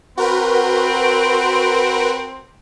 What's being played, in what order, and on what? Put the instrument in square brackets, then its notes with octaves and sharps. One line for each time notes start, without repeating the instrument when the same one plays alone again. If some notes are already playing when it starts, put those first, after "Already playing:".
[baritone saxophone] C4 [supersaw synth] F#4 A#4 B4